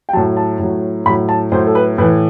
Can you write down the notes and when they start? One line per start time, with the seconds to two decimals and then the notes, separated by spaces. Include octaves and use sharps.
0.09 G5
0.13 F#3 A5
0.17 A2
0.37 A5
0.59 A2 F#3
1.06 A2 B5
1.08 F#3
1.29 A5
1.52 A2 F#3 C5
1.67 A4
1.75 B4
1.98 A2 B4
2.01 E3